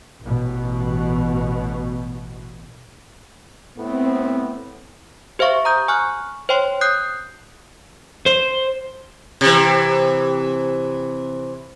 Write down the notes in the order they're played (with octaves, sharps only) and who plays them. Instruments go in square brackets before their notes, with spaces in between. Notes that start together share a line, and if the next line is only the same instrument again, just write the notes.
[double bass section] A1 B2
[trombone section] A2 B3 [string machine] C4
[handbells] G4 C5 E5 F5 C#6
A#5 D#6 G6
G#5 C#6 F6 F#6
C5 C#5 G5 C6
D#6 F#6 G6 C7
[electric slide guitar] C5
[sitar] C3 E3